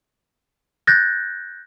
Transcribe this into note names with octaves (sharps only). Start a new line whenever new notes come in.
F#6 G6 A6 A#6